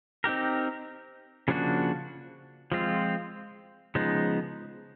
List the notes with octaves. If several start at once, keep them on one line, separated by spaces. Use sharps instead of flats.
C4 D#4 G4 A#4
C#3 F3 A#3 D4 F#4
F3 G#3 C4 F4
C#3 F3 G#3 B3 D#4